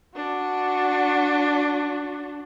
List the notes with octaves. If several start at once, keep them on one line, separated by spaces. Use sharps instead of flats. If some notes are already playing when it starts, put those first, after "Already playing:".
D4 F#4